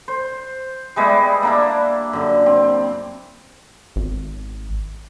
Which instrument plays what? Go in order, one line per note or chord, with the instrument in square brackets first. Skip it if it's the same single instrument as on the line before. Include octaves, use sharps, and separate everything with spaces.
[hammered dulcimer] C5
G3 G#3 B3 E4
A#3 D4 E4
F#2 D3
C4
[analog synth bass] G#1